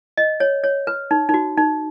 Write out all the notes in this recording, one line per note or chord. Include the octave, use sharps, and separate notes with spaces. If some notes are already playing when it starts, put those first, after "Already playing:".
D#5
C#5
C#5
B4
D#4
D#4
F#4
D#4